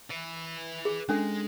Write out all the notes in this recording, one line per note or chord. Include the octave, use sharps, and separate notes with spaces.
B4 E5
G#4
G#3 C#4 D4 A4